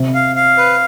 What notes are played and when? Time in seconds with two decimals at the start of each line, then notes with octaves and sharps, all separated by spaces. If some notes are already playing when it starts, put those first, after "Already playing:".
Already playing: C3
0.14 F5
0.35 F5
0.57 B4